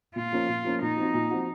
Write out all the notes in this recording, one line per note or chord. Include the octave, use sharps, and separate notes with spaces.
A#2 F4
F3 A#3 C#4
A#2
F3 A#3 C#4
A#2 D#4
F3 C4 F#4
A#2
F3 C4 F#4